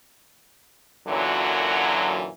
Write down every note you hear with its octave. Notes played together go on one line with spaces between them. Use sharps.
F#2 A#2 D3 E3 F#3